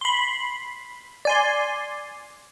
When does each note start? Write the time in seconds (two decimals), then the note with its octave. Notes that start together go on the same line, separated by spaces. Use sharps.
0.01 B5 C6
1.25 D5 G#5 C6